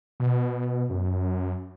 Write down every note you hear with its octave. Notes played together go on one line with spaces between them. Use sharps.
B2
F#2